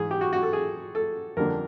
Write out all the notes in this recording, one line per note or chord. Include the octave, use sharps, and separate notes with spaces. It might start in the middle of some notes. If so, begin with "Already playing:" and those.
Already playing: G#2 E3 G#4
G4
F#4
F#4
A4
G#4
A4
F2 D3 G3 A#3 D4 A#4